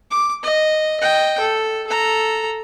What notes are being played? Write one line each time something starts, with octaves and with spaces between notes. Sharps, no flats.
D6
D#5
D#5 G5
A4
A4 A#5